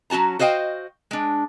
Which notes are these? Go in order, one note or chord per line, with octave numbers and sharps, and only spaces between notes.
F#3 C#4 F#4 A5 A#5
F#4 C5 D#5 F5 G5
G#3 D4